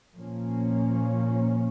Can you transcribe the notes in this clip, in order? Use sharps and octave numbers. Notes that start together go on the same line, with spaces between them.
A#2 F3 A#3 C#4